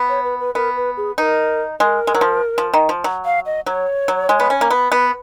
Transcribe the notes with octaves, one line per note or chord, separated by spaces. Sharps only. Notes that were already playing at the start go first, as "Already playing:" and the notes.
Already playing: B3
C#5
B4
B4
B3 A#4
B4
G#4
D#4 A#4 B4
G#3 A#4
G#3
F#3
F3
F3
D#3
F3
F#3
F5
D#5
F#3 C#5
F#3
G#3
B3
C#4
A#3
B3
B3 B4